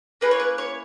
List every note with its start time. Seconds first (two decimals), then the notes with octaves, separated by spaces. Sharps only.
0.21 A#3 E4 G#4 B4
0.31 C#5
0.40 B4
0.58 C#5